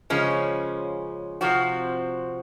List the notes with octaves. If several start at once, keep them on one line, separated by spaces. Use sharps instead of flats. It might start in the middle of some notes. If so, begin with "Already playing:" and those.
C#3 F3 G#3 C#4
C3 F3 C4 F#4